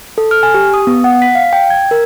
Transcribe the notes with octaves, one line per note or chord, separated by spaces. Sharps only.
A4
F6
G#5
G4
D#6
B3
F#5
B6
F5
G5
G#6
A#4